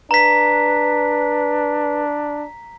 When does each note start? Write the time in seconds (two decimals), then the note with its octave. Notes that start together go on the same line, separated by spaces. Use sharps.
0.11 D4 B4 A#5 B6